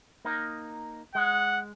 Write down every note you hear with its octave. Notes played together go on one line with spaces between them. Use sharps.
A#3 D#4
G#3 F#5